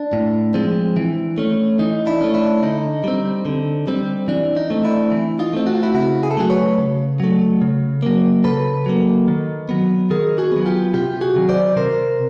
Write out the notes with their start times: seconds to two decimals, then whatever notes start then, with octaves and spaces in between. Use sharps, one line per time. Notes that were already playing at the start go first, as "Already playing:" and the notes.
Already playing: D4
0.13 A2
0.54 F3 G#3 C4
0.97 E3
1.38 A3 C#4
1.79 E3 D#4
2.06 D4 E4
2.21 A3 C#4
2.34 D4 E4
2.62 D3 D#4
3.04 G3 C4
3.45 D3
3.87 G3 C4
4.28 E3 D4
4.57 D#4
4.70 A3 C4
4.84 D4 E4
5.11 E3
5.39 D#4 F4
5.53 A3 C4
5.67 F#4
5.75 F4
5.83 E4 F#4
5.94 C#3 E4 F#4
6.23 G#4
6.31 A4
6.37 F#3 A3 F#4 G#4
6.50 B4 C#5
6.79 C#3
7.20 F#3 A3
7.62 C#3
8.03 F#3 A#3
8.44 C#3 A4 B4
8.86 F#3 A#3
9.28 D#3
9.69 F#3 B3
10.10 D#3 G#4 A#4
10.38 F#4 G#4
10.52 F#3 B3
10.66 F4 G4
10.94 C3 F4 G4
11.21 F#4 G#4
11.36 D#3 F#3
11.49 C5 D5
11.77 C3 A#4 C5